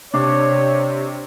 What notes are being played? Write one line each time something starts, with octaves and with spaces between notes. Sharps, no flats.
C3 D4 C#5